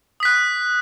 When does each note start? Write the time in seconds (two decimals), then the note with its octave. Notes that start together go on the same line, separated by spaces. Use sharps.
0.20 D#6
0.23 B6
0.25 F#6